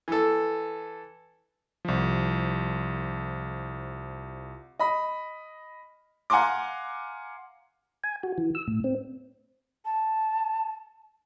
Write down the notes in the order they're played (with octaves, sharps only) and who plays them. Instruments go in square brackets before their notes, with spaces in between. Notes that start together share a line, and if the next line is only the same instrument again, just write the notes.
[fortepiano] E3 A4
[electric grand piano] C2 F3
[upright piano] D#5 B5
F5 F#5 G#5 A#5 C6 D6
[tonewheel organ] G#5
F#4
E3
E6
A2
C4
[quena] A5